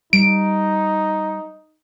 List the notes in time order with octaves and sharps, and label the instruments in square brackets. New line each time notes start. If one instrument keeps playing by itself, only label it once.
[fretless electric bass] G3 [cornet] D#4 [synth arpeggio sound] D7